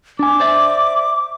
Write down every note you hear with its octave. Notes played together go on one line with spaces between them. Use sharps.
D4 G#5 D6
C5 D5 E5